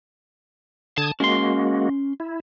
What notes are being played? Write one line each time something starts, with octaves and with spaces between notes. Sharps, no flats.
D3 A5 D#6 G#6
G#3 A#3 C#4 F#4 C6
E4